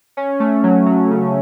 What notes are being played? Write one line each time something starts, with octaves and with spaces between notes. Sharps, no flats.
C#4
A3
F#3
F#3
C#3